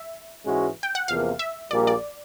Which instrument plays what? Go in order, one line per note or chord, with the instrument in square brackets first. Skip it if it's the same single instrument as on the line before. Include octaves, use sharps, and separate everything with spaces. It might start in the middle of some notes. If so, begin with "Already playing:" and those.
Already playing: [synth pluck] E5
[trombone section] G#2 E3 G#3 C#4 F#4
[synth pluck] G5
F#5
[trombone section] E2 C3 F3 A#3 [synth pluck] F5
[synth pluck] E5
[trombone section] A#1 A#2 G3 A#3 [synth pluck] D5
[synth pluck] D5